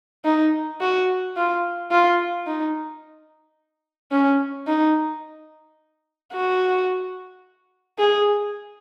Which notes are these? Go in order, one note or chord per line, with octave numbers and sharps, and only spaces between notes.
D#4
F#4
F4
F4
D#4
C#4
D#4
F#4
G#4